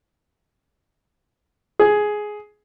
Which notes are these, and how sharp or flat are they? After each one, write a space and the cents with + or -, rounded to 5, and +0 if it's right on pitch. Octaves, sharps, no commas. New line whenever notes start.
G#4 +10